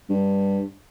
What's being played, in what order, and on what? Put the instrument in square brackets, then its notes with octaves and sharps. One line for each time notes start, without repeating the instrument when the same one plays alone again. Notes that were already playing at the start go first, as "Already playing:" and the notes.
[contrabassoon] G2